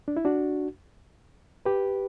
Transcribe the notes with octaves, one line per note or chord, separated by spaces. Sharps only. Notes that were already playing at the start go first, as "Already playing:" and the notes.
D4
E4
D4 F#4
G4 B4